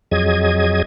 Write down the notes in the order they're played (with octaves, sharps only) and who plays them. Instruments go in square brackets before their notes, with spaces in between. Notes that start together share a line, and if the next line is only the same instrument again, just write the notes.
[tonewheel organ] F2 F#3 G#4 D#5 G#6